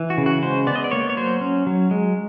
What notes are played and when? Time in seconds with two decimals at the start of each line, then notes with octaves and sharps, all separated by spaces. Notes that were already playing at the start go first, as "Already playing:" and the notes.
Already playing: E3
0.10 F#4
0.18 C#3
0.26 F#4
0.42 G#3 C5
0.67 B3 D5
0.76 D#5
0.84 D5
0.91 A#3 C#5
1.10 C#5
1.17 F#3 C5
1.41 C#4
1.67 F#3
1.91 G#3